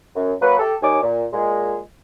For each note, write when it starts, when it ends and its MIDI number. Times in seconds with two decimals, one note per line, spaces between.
0.16 0.34 42
0.42 0.58 54
0.42 0.58 58
0.42 0.58 71
0.59 0.76 67
0.59 0.76 69
0.82 1.02 39
0.82 1.02 63
0.82 1.02 73
0.82 1.02 80
0.82 1.02 86
1.03 1.26 46
1.33 1.79 46
1.33 1.79 56